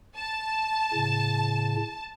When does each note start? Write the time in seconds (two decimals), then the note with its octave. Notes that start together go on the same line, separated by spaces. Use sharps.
0.17 A5
0.93 A2 C#3